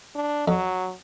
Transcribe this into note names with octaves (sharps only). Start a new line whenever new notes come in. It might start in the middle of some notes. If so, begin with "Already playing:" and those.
D4
F2 F#3